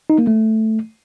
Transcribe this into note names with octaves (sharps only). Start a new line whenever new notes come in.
D#4
A#3
A3